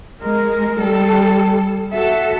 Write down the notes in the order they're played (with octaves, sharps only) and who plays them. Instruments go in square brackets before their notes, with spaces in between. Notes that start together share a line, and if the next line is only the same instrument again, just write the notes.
[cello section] G#3 [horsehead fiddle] A#4
[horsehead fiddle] G3 [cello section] A4
[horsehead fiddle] F#4 E5 [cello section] A4